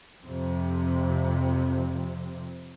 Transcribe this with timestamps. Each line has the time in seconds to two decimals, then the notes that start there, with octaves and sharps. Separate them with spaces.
0.24 F2 C3